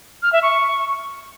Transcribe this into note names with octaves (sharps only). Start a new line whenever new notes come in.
F6
E5
C#6